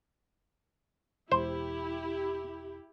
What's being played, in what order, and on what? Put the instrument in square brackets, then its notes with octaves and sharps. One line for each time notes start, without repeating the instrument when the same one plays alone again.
[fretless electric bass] E1 [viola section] E4 G4 [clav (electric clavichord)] C5